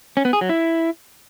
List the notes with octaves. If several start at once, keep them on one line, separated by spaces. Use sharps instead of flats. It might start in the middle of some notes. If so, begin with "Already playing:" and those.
C#4
B3
G#4
F#3
E4